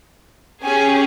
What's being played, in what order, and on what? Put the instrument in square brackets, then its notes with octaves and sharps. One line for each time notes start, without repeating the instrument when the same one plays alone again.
[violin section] C#4 G4 G#4 [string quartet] G#5